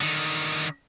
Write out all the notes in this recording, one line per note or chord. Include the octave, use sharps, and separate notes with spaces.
D3 D#3